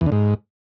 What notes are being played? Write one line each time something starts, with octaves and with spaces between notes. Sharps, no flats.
E2
D3
G#2